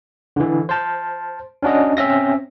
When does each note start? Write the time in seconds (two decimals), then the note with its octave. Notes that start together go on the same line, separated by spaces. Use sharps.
0.36 D3 E3
0.69 C5 A5
1.63 C#4 D4 F#4 D#5
1.97 C4 C#4 E5 A#6